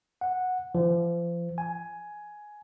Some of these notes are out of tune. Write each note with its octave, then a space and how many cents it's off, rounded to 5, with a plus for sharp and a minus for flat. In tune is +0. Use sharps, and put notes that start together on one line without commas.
F#5 -10
F3 -35
G#5 +10